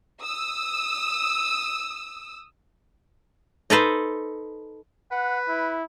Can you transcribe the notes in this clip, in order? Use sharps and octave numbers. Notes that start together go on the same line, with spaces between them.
D#6 E6
D#4 A4 B4 C5
B4 F#5
E4